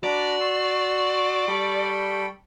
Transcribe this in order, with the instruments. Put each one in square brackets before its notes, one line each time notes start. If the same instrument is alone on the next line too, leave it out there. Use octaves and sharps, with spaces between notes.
[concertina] D4 A#5 B5 [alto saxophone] F#4 [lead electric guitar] D5
[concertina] C6 E6 [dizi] C#6
[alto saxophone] G3 [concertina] A4 G5 B5